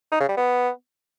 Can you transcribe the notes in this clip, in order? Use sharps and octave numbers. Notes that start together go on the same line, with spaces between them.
D#4
C#3
G3
B3